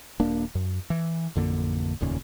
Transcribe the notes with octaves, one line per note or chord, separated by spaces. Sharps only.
D#1 A#3 D4
F#2
E3
A1 F2 D3 A#3
F1 D#2 A#2 C#3